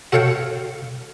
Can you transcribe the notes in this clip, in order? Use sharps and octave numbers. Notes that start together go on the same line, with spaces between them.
F#4 A4 C#5 F5 G5